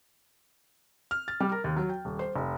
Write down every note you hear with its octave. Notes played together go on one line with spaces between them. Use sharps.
F6
A6
G3
A#4
D#2
F#3
G5
D#1
C5
F1